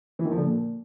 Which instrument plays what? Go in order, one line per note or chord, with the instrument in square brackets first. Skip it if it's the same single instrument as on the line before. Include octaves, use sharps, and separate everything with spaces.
[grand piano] E3
D#3
F3
D3
A#2